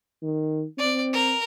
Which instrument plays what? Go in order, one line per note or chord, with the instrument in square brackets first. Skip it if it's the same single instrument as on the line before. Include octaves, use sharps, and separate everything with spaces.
[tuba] D#3
[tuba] C4 [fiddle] D5
[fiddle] A#4